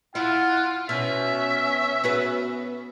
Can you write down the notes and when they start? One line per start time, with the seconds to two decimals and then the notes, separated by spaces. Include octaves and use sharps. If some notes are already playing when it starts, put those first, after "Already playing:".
0.15 E4 F4 F#5
0.89 B2 C#4 E5
2.04 B3 F#4 B4